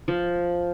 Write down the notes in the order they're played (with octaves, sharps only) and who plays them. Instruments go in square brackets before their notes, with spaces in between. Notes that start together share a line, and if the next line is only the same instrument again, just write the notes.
[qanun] F3